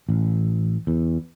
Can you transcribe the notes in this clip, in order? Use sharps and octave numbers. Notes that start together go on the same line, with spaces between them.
A1
E2